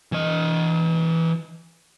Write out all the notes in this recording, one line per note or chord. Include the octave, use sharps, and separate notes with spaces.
E3 D#5